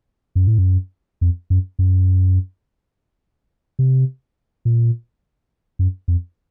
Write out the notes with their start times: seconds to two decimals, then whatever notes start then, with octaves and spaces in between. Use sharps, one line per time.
0.35 F#2
0.47 A2
0.58 F#2
1.21 F2
1.50 F#2
1.79 F#2
3.79 C3
4.65 A#2
5.79 F#2
6.08 F2